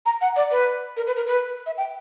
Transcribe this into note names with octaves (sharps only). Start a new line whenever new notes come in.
A#5
F#5
D5
B4
A#4
B4
A#4
B4
E5
G5